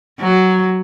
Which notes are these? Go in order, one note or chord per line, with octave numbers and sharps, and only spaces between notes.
F#3